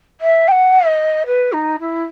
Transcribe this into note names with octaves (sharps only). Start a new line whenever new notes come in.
E5
G5
F#5
D#5
B4
D#4
E4